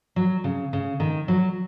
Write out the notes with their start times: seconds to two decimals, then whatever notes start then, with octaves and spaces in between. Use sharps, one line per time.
0.16 F#3
0.44 C#3
0.73 C#3
1.00 D#3
1.28 F#3